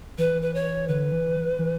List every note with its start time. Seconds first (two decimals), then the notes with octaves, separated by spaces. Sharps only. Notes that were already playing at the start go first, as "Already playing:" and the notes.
0.18 E3 B4
0.42 B4
0.54 C#5
0.88 D3 B4
1.12 E3
1.59 E3